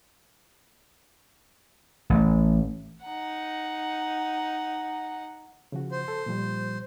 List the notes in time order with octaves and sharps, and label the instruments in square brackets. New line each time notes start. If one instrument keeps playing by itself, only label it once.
[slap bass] A1
[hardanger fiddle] D#4 F#5
[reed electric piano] C#3 F3 F#4
[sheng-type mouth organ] C5
[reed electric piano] A4
A#2 F3 G3